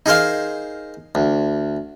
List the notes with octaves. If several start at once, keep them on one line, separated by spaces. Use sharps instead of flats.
D#4 G#4 A#4 C5 F5
D2